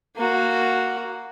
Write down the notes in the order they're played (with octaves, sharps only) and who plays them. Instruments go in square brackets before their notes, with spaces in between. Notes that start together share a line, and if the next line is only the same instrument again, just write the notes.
[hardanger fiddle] A#3 F#4